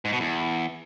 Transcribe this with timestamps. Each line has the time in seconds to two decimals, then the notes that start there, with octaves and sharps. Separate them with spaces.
0.05 G#2
0.12 B2
0.20 E2